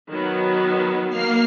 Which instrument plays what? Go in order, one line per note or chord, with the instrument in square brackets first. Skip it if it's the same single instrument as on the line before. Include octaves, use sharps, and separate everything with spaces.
[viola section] D#3 F#3 B3
[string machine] A#3 F6 C7